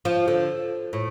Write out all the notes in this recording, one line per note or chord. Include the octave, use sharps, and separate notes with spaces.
F3
D3
A2